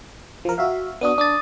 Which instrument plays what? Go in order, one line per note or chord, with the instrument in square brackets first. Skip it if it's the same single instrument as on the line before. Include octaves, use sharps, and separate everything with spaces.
[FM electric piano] F3 A#4
F#4 E5 F5
[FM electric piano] B3 D4 F#4 [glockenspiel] D#6 D#7
[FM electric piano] D4 [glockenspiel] D6 D#6 A6